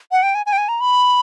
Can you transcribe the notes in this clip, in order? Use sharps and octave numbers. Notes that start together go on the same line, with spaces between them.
F#5
G5
G#5
G#5
G5
G#5
A#5
B5